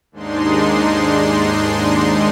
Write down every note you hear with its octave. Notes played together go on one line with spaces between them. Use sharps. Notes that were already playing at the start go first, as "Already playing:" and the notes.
D#2 G#2 G#3 D4 D#4 C6